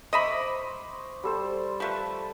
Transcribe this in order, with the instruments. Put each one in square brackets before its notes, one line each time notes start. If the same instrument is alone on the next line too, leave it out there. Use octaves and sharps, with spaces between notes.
[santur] C5 C#6 D6 [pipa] D#5 E5 B5
[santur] G3 A4 C5
[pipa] F3 A3 [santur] B4 A5